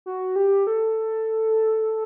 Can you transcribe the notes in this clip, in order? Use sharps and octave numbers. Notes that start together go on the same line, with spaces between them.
F#4
G4
A4